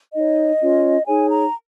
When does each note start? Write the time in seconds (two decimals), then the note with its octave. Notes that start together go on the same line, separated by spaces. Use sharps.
0.14 D#4 C#5 D#5
0.60 C#4 F4 C#5
1.07 D#4 G#4 C#5 G#5
1.30 A#5